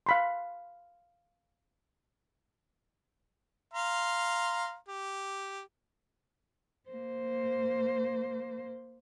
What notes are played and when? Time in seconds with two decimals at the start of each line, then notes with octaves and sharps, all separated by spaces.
0.06 F5 B5 C6
3.74 F5 A#5 C6
4.88 G4
6.90 A#3 C5